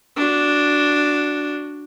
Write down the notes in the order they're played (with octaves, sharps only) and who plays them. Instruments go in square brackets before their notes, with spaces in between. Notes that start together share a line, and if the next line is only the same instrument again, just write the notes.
[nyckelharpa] D4 F#4